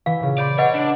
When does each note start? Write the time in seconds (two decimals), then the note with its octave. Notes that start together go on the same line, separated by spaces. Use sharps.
0.06 E3 F5
0.20 A#2 C#3
0.38 D5 B5 C6 G6
0.58 B4 C#5 D#5 F#5
0.74 D4